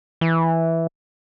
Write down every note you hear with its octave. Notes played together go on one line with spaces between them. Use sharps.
E3